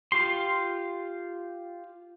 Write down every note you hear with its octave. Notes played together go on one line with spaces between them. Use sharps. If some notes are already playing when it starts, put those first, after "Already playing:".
F4 G4 C6